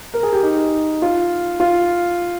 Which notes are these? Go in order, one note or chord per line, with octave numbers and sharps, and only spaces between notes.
A#4
G#4
G4
D#4
F4
F4